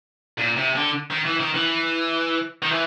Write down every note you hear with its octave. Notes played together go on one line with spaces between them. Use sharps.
A#2
C3
D3
D#3
E3
D#3
E3
D#3
E3